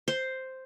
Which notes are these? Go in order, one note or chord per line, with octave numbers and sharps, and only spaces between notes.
C5